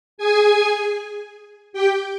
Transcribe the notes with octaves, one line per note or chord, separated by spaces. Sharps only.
G#4 G#5
G4 G5